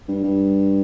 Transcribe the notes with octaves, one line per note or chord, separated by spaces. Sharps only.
G2
G2